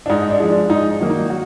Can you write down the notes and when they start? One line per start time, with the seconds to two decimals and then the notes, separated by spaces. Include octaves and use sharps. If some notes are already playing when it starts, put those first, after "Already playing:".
0.06 D4
0.10 G#2 D#4
0.30 D4
0.40 F3 G#3
0.50 D4
0.70 G#2 D#4
0.90 D4
1.00 D#3 F#3 A#3
1.10 D#4
1.30 F#4